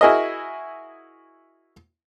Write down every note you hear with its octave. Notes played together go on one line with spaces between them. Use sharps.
E4 F#4 G#4 A#4 D#5